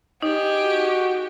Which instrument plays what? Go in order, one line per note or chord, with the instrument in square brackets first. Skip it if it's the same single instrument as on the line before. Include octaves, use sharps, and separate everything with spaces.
[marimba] D#4 [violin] G4 G#4 [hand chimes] D#5
[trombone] F#4